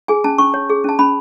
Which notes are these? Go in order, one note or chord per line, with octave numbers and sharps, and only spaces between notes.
G#4 G#5
C#4 A5
C#4 C#6
C#5
G#4
C#4 A5
C#4 B5